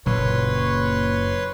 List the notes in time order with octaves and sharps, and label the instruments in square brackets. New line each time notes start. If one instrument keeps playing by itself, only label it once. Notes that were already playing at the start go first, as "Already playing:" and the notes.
[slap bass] F#1 [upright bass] A#2 [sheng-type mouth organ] B4 C#5 C6